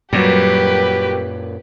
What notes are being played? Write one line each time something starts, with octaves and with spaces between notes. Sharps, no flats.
F#2 A#2 F#3 G3 G4 B4